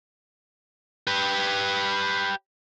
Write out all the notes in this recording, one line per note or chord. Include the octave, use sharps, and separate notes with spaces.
G4 B4